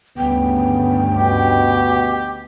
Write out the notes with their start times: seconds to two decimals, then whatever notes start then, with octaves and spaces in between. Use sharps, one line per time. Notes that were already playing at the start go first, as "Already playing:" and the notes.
0.18 D2 G2 C#3 B3 G5
1.16 B2 G4